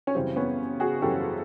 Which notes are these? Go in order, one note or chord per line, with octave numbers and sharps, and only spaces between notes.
C#4
F#2 C#3 E3 G3 C4
B3 C#4
F#4 G#4
F#2 C#3 E3 G3 G4 A4